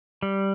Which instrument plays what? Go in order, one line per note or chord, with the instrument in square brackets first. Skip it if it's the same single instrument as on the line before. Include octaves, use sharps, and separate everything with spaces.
[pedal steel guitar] G3